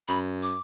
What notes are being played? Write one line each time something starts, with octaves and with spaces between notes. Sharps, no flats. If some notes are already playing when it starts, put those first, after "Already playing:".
F#2 B5
D6